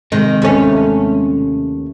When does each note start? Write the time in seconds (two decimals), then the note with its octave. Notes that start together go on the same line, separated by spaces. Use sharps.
0.12 C3 D#3 G#3
0.42 D#2 A3 C#4